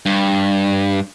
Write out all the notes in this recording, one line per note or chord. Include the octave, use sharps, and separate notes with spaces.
G2